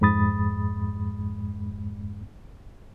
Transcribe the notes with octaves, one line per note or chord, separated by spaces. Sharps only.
F2 G#2 G#3 B5 D#6 A6